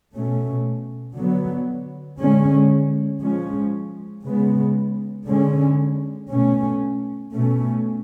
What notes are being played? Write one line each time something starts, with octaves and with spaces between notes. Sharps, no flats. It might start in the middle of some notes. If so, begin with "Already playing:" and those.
B2 A3 C#4
D3 F#3 B3
D3 G#3 C#4
F3 G#3 C#4
C#3 G#3 B3
D3 G#3 C#4
B2 A3 C#4
B2 A3 C#4